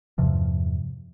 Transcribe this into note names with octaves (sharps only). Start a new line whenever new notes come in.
E2 G2 C3 F3